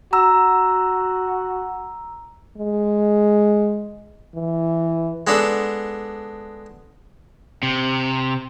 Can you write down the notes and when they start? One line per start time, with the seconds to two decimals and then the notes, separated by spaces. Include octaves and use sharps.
0.13 F#4 A#5 E6
2.58 G#3
4.35 E3
5.27 G#3 B3 D4 A4
7.63 C3